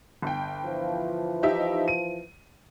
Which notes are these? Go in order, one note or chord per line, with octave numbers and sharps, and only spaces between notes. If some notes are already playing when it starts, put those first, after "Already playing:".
G1 G5
E3 F3
D#4 G4 E5
D#7